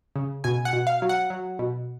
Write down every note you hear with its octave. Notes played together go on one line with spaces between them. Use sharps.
C#3
B2 G#5
F#5
B2
F5
F#3
F#5
F#3
B2